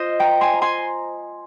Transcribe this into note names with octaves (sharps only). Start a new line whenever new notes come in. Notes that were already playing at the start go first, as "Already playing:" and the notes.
Already playing: F4 C5 D#5
G5 A#5
G#5 C6
A#5
G#5 C6